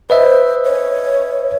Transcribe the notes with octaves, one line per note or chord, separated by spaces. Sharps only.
B4 C5 D#5 E5
C#5